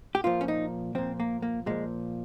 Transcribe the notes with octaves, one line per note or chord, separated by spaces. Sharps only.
G4
A#2 F3 F4
C#4
D#4
A#2 F3 C4
A#3
A#3
A#2 F3 G#3